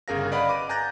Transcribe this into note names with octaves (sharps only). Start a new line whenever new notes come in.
G1 C#3 G#4 A#4 F5 A#6
B4 D5 D#5 F5 F#5 B5
D6 D#7
G#5 A#5 F#6 G6 A6 A#6